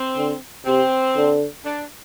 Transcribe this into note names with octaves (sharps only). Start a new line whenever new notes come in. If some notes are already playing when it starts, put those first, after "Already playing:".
Already playing: C4
D3
C3 C4
D3
D4